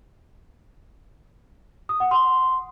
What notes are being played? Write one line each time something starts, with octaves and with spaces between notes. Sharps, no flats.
D#6
F#5
C6